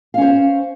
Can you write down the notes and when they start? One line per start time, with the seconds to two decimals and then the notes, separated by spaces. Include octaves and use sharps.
0.14 F5
0.18 C#4
0.21 C5